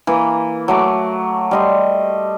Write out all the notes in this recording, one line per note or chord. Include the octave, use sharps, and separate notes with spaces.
E3 A#3
F#3 A3 D6
G3 D#5 C6